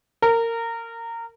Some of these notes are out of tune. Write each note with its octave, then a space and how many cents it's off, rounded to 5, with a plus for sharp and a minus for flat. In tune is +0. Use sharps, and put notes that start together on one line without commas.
A#4 -20